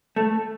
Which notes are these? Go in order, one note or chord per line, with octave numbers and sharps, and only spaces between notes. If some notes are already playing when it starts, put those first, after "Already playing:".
A3